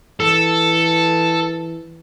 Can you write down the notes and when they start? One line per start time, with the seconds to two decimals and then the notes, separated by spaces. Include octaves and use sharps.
0.20 E3 A4